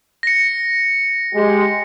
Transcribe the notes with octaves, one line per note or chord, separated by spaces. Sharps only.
A#6 C#7
G#3 G4